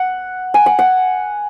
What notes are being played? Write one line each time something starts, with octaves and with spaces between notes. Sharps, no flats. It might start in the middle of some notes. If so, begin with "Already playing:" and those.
Already playing: F#5
G#5
F#5
F#5